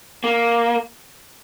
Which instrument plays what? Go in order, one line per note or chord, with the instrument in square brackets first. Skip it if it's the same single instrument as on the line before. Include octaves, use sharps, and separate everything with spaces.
[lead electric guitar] A#3